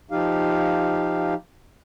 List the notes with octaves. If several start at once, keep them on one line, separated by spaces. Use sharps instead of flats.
F3 D#4 G4 F5